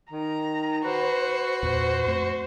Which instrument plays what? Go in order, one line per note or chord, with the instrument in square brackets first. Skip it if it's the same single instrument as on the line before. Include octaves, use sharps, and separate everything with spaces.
[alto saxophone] D#3 [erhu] A#5
[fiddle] F#4 [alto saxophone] B4 [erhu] C5
[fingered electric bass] E2 A#2 [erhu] C5
[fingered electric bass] F2 A3